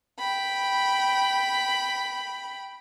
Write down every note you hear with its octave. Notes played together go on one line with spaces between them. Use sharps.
G5 B5